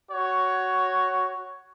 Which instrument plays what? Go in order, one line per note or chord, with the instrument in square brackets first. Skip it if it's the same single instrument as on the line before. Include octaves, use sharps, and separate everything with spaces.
[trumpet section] F#4 C#5